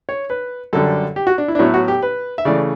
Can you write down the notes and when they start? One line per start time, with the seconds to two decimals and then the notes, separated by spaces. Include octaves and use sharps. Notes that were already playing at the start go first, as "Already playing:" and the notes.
0.09 C#5
0.30 B4
0.73 F#2 D3 G3 A4
1.16 G4
1.27 F#4
1.38 D4
1.48 E4
1.55 D4
1.59 A2 F#3 B3 E4
1.74 F#4
1.88 G4
2.02 B4
2.38 E5
2.45 C#3 E3 A3 D5